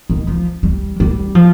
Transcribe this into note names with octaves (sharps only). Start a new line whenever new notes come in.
D#3
F3
G3
G3
F3